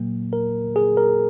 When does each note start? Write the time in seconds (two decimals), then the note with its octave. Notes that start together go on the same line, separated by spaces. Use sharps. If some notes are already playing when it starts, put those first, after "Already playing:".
Already playing: A#2 F#3 A#3
0.33 A#4
0.76 G#4
0.97 A#4